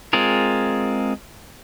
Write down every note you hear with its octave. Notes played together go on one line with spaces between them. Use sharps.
G#3 C4 F4 G#4 A#4